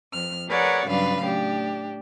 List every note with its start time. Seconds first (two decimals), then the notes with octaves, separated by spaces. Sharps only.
0.13 F2 F6
0.49 G#4 A#4 B4 C#5 D5 F#5
0.86 G2 C#3 F#3 D4 B4 F5
1.21 A2 D4 G4